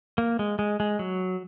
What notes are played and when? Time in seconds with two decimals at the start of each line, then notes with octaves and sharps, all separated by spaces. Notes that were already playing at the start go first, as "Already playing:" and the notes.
0.18 A#3
0.39 G#3
0.59 G#3
0.80 G#3
0.99 F#3